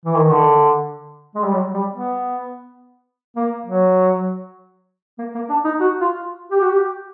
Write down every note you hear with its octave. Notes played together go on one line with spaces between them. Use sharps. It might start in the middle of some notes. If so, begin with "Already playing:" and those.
E3
D#3
D3
G#3
G3
F#3
G3
B3
A#3
F#3
A#3
A#3
D4
D#4
F#4
F4
G4
F#4
G4